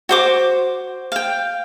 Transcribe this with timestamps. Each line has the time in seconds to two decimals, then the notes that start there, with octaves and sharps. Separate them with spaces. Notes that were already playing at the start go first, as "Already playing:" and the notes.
0.09 F#4 C5 D6
1.12 F5 G5